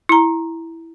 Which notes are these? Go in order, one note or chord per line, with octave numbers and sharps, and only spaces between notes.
E4 A#5